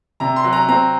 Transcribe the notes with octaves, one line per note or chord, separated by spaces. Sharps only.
C3 A#5
C6
F#3
A#5
C4 A#5